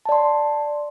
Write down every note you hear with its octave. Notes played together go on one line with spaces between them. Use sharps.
D5 A5 C6